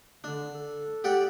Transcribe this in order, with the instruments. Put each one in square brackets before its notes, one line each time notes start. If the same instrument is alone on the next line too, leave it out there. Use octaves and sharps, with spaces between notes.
[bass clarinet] D3 [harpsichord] D4
[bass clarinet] A4
[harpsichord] G4 D5 F#5